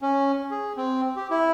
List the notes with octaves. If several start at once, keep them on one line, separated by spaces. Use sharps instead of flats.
C#4
G#4
C4
G4
E4